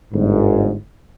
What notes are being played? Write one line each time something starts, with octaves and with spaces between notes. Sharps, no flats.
G1 G#2